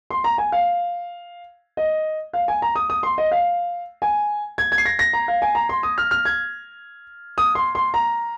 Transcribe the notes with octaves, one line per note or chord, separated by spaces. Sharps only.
C6
A#5
G#5
F5
D#5
F5
G#5
A#5
D#6
D#6
C6
D#5
F5
G#5
G#6
G#6
C7
A#6
A#6
A#5
F5
G#5
A#5
C6
D#6
F6
F6
G#6
D#6
C6
C6
A#5